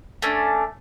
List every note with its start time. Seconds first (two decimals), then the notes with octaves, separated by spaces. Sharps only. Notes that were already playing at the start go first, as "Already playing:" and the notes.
0.22 A3 C#4 D4